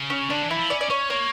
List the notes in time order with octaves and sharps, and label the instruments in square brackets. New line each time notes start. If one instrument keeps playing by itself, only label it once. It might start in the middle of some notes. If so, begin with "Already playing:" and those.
Already playing: [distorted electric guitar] C#3
[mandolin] C#4
[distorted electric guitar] D3 [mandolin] D4
[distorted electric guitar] E3
[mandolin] E4
[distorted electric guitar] F3
[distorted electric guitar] C#4 [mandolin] D5
[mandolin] D5
[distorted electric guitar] C#4 [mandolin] C#5
[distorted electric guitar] A#3 [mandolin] C#5